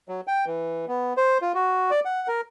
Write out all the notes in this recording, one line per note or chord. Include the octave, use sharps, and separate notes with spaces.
F#3
G5
E3
B3
C5
F4
F#4
D5
F#5
A#4